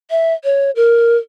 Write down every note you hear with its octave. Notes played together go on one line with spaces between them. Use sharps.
E5
C#5
A#4